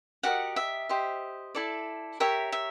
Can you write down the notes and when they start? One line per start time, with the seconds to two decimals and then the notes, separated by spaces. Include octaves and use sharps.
0.23 F#4 G4 A#4 D#5 F#5
0.56 E5
0.89 G4 C5 D#5
1.55 E4 A4 D5
2.20 G4 A#4 C#5 E5
2.52 E5